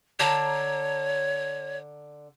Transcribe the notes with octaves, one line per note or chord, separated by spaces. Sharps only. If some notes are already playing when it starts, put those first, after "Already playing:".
D3 C#5 A5 A#5